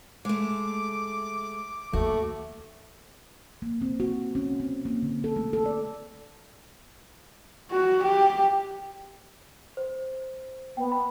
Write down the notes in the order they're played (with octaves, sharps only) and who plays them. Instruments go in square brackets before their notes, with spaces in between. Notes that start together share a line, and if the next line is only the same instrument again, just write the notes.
[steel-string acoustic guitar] G#3 A3 [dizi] D6
[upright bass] D#2 [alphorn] A3 [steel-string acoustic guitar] F#4
[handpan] A#3
C4
F#4
C#4
C4
A#3
D3
A4
A3
A4
D5
[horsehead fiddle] F#4
G4
[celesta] C5
[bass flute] B3 [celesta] G5
[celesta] B5